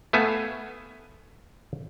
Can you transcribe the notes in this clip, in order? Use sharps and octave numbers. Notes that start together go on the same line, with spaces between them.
A3 B3 E5 F5 G#5